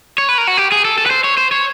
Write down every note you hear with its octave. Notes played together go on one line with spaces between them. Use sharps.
C#5
B4
A#4
F#4
G4
G#4
A4
A4
B4
C5
C#5
C5
C#5